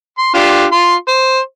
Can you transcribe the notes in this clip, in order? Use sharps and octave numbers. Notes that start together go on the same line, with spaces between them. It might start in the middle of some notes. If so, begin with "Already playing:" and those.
C6
D4 F4 G4
F4 C6
C5